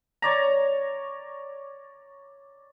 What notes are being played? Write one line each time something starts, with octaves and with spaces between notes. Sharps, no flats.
C#5 D5 A#5